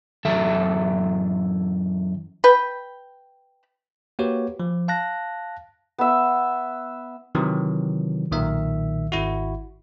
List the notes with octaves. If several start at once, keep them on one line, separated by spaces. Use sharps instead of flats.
F#2 E3 A4 E5
B4 G5
A#3 F#4 G4 B4 C#5
F3
F5 A5 F#6 A#6
B3 E5
C3 D#3 E3 F#3
B1 A#2 D#3 E5
G#1 E4 F#4